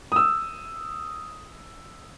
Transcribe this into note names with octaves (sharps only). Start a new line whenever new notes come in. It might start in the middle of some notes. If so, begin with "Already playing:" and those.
D#6 E6